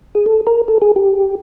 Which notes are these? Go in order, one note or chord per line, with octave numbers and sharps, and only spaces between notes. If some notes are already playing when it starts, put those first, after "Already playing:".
G#4
A4
A#4
A4
G#4
G4